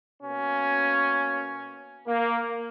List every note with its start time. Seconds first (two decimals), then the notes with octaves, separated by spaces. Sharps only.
0.23 B2 A#3 C#4
2.07 A#3